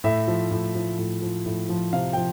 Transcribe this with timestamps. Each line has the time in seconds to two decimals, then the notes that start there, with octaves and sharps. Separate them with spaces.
0.04 A2 E5
0.28 F3
0.51 A2
0.75 F3
0.99 A2
1.22 F3
1.46 A2
1.69 F3
1.93 C3 F5
2.13 F3 G5